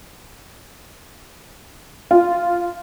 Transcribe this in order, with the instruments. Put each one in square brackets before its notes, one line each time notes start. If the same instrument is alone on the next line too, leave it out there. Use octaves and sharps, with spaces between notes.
[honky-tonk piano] F4